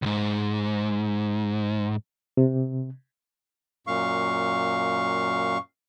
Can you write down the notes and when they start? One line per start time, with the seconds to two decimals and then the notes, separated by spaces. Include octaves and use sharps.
0.02 C#2 G#2
2.37 C3
3.87 F#2 A#2 F5 C#6